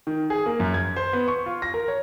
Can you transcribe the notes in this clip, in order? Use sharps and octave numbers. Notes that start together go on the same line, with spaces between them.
D#3
G#4
A#3
F#2
G#6
C5
B3
C#6
F4
A#6
A#4
C#5